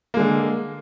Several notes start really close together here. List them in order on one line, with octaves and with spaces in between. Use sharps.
A#3 G#3 D3